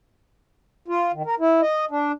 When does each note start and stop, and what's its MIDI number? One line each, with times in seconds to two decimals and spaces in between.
0.88 1.12 65
1.13 1.23 51
1.26 1.35 70
1.40 1.61 64
1.62 1.85 75
1.91 2.12 62